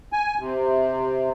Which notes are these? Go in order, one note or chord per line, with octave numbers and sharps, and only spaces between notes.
G#5
C3